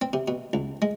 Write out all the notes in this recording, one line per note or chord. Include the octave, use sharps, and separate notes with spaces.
C4
C3
B2
C#2
G#3